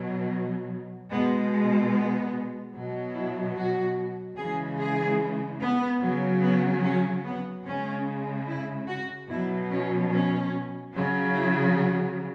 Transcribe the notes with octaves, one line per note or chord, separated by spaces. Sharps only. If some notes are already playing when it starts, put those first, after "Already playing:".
Already playing: B2 F#3
B2 G#3 B3
B3
B2 F#3
E4
F#4
C#3 E3 G#3 G#4
G#4
B3
C#3 F#3
B3
C#4
B3
C#3 G#3 C#4
E4
F#4
B2 F#3 E4
C#4
C#4
C#3 F#3
E4
F#4